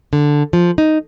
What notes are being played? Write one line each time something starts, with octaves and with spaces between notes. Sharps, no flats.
D3
F3
D#4